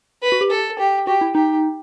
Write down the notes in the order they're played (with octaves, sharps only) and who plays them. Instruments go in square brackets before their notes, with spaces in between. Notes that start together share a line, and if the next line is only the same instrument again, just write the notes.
[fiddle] B4
[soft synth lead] F#4
G4
[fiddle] A4
G4
[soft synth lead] F#4 [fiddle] G4
[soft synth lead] E4
[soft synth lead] D#4 [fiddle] G4